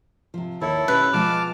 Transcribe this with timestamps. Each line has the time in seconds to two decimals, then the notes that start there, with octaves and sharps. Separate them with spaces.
0.34 C3 F3
0.61 D#2 D#3 E4 A4 C#5
0.88 B2 C#4 G4 B4
1.13 B2 F3 G#3 A5 D6 F6